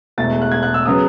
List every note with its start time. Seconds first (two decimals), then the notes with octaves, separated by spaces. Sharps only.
0.18 E1 E2 B2 A3 A6
0.42 F#6
0.51 G#6
0.63 F#6
0.74 E6
0.86 C#3 F#3 B3 D#6